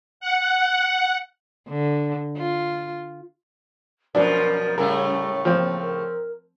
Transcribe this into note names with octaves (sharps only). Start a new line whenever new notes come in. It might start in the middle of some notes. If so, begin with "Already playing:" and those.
F#5
D3
F4
F#2 B2 F3 D4 A#4
A2 C#3 G3 A3 A#4
F3 A#3 C4
A#4